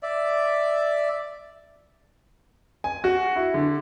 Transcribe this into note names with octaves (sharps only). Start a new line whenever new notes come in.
D5 E5
G#5
F#4
E4
D3